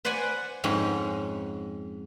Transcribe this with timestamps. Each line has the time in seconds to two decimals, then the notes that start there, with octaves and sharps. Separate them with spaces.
0.05 B4 C5 D5 F#5 G#5
0.64 F2 G#2 C#4